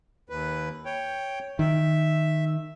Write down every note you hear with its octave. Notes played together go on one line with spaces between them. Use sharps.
D#2 B4
C#5 G5
D#3 E5